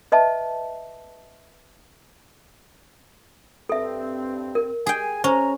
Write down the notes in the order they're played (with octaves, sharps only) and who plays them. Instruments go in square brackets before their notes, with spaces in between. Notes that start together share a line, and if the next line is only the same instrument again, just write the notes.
[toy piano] B4 D#5 E5 A5
[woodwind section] G2 C4 [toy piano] A4 E5
[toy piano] A#4
[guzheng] G#4 G5 [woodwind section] G#5
[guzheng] C#4 [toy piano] C5 [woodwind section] A#5